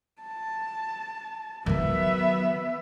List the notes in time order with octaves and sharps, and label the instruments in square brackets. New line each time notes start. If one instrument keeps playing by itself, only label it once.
[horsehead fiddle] A5
[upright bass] D#3 F#3 [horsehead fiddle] B3 E5